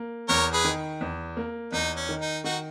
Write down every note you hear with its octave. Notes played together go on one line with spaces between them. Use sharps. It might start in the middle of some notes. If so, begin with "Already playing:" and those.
Already playing: A#3
E2 A#4 C#5
G#4 B4
D#3
E2
A#3
E2 D#4
C#4
D#3
D#4
D#3 D#4 F#4